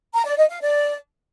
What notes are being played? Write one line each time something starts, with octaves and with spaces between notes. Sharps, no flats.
A#5
D5
D#5
F5
D5